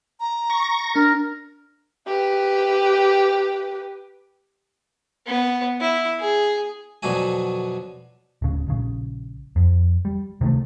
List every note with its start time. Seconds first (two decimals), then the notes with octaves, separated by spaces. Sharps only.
0.20 A#5
0.50 C#6 A#6
0.96 D4 A#4
2.07 G4 B4
5.27 B3
5.80 E4
6.20 G#4
7.03 F2 B2 D3 F#3 F#4 G#5
8.42 D1 C#3
8.68 A#1 C#3
9.56 F2
10.05 G3
10.41 C3 D#3 G3 A3